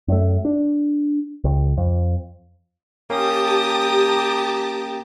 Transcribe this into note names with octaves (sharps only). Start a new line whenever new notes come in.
F#2 A3
D4
C#2
F2
A#3 C#4 G4 G5 A5 A#5 D6 D#6